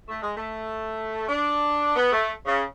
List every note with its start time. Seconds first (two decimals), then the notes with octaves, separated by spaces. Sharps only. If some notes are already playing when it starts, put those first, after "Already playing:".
0.09 A3
0.22 G#3
0.36 A3
1.29 D4
1.96 B3
2.12 A3
2.46 C#3